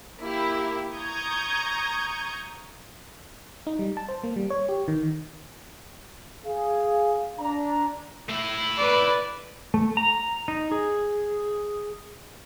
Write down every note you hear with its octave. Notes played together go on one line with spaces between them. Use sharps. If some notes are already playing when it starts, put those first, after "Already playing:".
A#3 E4 G4
A#5 C#6 D#6 G6 G#6
D#4
G3
A5
C5
A#3
G3
C#5
G4
D#3
G#4 F5
D4 A#5
A3 E4
B4 D5
A3
A#5
D#4
G#4